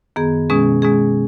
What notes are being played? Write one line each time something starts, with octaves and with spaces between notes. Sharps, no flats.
F#2 D#3 B3 G#4
B2 G#3 C#4 G#4
B2 G#3 C#4 G#4